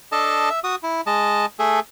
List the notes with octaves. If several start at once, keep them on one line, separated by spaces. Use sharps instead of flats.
D4 A4 D#5 A5
E5
F#4 D#6
E4
G#3 D#5 A5
A3 G#4 A4